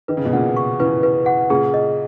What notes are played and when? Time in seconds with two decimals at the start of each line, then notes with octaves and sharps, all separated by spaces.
0.08 D#3 B4
0.17 C#3
0.25 B2
0.33 A#2 C#3 F#5
0.57 C#6
0.79 C#3 E3 B4
1.03 B4
1.26 F#5
1.50 A#2 C#3 G#4
1.74 D#5